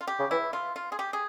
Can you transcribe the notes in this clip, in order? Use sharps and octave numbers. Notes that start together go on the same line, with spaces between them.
F4
G4
C#3
E3 E4
F4
F4
G#4
G4
G#4